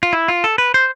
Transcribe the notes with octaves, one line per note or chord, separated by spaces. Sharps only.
F4
E4
F4
A4
B4
C5